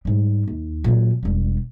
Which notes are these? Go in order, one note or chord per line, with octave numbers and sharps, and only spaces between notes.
G#2 G3
D#2
A#2 F#3
E1 G3